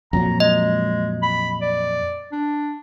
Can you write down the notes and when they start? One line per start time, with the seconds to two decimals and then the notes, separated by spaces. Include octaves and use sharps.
0.13 F2 A#2 F#3 A#5
0.40 G#3 D#5
1.22 B5
1.61 D5
2.32 D4